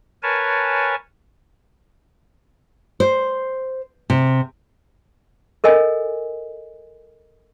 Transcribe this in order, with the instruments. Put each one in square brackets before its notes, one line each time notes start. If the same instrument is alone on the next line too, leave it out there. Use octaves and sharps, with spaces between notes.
[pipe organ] A#4 B4 C#5 G#5 A5
[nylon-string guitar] C5
C3
[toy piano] A4 A#4 D#5 G#5